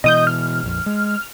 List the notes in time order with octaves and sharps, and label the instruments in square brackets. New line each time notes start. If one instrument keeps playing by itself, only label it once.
[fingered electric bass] B2 E3 [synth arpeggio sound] D#5 D#6 G6
[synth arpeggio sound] F6
[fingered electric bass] A#1 F2
G#3